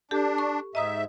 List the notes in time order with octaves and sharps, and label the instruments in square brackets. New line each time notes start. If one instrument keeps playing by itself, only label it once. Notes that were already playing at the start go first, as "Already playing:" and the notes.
[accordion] D4 [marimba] G4 A4
[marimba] C#6
[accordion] G#2 E5 [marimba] D#5 A#5 D#6